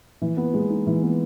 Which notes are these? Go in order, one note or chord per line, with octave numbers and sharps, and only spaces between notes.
E3
B3
G#3
D#4
E3
B3